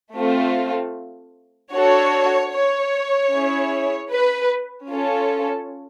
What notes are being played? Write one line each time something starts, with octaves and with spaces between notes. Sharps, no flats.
A3 C4 F4
D4 F#4 A4 C#5
C#5
C#4 E4 G#4
B4
C#4 F4 A4